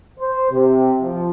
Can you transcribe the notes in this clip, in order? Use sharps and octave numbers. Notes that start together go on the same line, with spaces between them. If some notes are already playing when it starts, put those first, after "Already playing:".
C5
C3
F3